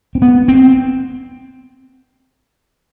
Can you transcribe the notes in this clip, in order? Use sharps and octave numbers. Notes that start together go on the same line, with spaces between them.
C4
B3
C4